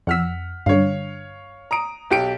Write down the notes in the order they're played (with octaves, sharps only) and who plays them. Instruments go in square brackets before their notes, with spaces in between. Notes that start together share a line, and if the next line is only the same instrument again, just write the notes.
[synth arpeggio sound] F2 E6 [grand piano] F#5 F6 B6
[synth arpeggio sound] G2 D3 [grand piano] C#5 F5
[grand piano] A#5 D#6 D7
B1 G4 D7